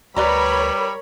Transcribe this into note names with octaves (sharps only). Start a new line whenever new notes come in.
D2 G3 A#4 B4 C#5 D5 A#5 B5